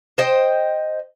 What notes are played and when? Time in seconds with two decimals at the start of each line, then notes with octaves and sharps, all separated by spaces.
0.18 C5 D#5 G5